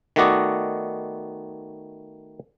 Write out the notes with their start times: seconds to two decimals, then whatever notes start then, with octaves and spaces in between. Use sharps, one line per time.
0.16 D#3 A3 B3 F#4 D5 D#5